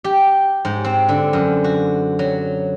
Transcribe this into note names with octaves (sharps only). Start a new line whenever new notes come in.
G4
G#2
C4
D3
F#2
F#4
F#3